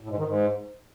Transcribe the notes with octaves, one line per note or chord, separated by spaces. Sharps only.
A2
G#2
D#3
G#2